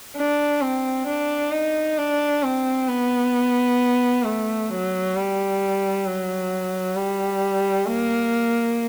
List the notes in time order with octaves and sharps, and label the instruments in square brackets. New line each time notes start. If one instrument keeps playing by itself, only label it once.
[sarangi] D4
C4
D4
D#4
D4
C4
B3
A3
F#3
G3
F#3
G3
A#3